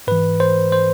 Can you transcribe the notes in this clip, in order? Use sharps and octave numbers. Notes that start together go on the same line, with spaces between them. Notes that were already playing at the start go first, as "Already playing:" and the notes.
G#2 E3 B4
C5
C5